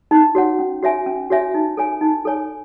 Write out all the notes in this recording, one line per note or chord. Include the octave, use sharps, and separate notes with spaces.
D#4
F#4 C#5 F#5
C#4
F#4 C#5 E5 G#5
C#4
F#4 C#5 E5 G#5
D#4
A4 C#5 G#5
D#4
A4 C#5 G#5